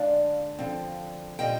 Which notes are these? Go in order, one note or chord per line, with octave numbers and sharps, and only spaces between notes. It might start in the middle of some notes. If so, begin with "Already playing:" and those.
Already playing: D3 G#3 D4 D5 F5
D3 F3 C4
A#2 G3 C4 D#5 G5